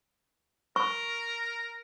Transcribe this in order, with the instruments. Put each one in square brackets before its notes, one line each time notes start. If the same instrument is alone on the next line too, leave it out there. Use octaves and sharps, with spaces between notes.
[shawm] A#4 [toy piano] C#6